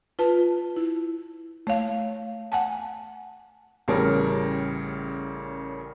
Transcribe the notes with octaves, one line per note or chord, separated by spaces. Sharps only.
F4 B4 A5
E4
A3 C#5 F5
F#5 G#5 A5
A1 A2 C#3 G3 A#4 A5